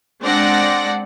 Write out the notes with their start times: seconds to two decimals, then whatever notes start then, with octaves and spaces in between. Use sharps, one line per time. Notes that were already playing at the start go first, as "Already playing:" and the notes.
0.22 G#3 C4 D4 D5 F#5 A#6